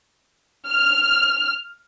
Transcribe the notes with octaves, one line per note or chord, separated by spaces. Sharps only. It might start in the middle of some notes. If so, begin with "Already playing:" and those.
F6